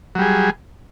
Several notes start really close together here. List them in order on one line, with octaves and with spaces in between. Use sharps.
F#3 G3 G#4